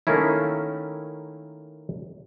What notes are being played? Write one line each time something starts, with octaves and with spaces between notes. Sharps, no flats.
D#3 A3 A#3 C#4 E4